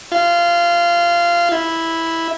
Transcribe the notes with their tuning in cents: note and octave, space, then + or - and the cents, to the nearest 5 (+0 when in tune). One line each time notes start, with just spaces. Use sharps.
F4 -20
E4 -5